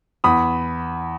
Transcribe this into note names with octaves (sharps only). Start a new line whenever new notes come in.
E2 B5 D#6